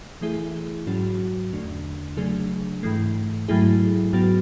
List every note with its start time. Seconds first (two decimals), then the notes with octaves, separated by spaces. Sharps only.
0.21 E3 A3 E4 G#4
0.87 G#2 F#3 C#4 F#4
1.52 E2 D3 A3 D4
2.17 C#3 F#3 A3 D4 G#4
2.83 G#2 E3 A3
3.48 G#2 F#3 A3 E4 G#4
4.13 G#2 F#3 B3 F#4